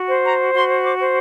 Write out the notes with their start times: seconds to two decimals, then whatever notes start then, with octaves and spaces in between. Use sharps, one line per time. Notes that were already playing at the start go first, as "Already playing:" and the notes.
Already playing: F#4
0.08 C5
0.23 A#5
0.53 F#4 C6
0.83 D6
0.98 C5